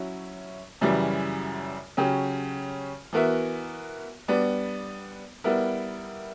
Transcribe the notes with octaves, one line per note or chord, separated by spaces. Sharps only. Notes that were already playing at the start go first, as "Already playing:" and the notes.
Already playing: F#3 C#4 E4
F#2 C#3 E3 G3
C#3 F#3 C#4 G4
E3 B3 F#4 A#4 E5
G3 B3 D4
G3 B3 E4 A#4